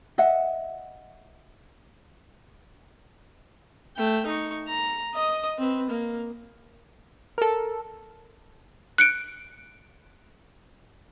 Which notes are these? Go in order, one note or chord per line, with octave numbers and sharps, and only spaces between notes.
D#5 E5 F#5
A3 G5
D#4 C#6
A#5
D#5 D#6
C4 B4
A#3
A4 A#4
F#6 C#7 D7